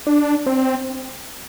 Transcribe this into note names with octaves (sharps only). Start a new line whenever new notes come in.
D4
C4